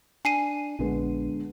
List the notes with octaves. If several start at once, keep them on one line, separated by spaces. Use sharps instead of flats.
D4 G#5 C7 D#7
A#1 D3 G#3 B3